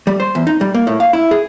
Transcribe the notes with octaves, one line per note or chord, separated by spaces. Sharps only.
G3
C5
E2
D#4
G3
A#3
A2
F5
E4
G#4